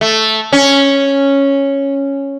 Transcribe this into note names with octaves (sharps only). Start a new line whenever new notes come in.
A3
C#4